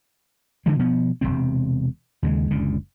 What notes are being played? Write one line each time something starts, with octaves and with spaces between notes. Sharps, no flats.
D3 E3 F3 G#3
B2 F3 B3
E1 C#2 C3 C4
D#2 C#3 G#3
F#1 C#2 D3